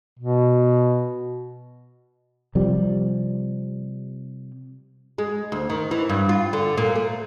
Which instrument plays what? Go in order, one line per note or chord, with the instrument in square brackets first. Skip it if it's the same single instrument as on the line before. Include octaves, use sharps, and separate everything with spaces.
[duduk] B2
[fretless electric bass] C3 F3 G3
[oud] G#3
D2
D#3
E3
G2
F4
D3
A#2
A3